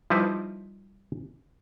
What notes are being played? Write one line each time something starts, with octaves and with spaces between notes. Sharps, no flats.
F3 G3 D#4 E4 B4 C5